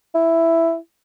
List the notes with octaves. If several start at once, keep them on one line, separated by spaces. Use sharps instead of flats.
E4